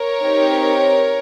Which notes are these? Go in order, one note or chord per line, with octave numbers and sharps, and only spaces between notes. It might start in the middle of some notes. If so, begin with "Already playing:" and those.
Already playing: A#4 C#5
C4 D#4 G4